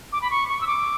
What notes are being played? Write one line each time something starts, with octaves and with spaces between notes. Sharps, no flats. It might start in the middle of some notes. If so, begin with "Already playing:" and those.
D6
B5
C#6
C#6
E6
D6